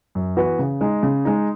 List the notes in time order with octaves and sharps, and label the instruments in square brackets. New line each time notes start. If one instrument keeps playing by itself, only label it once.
[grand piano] F#2
E3 B3 F#4 B4
C#3
G#3 D#4
C#3
G#3 D#4